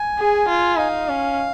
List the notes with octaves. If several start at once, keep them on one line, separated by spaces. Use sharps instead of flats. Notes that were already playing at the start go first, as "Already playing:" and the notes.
Already playing: G#5
G#4
F4
D#4 F5
C#4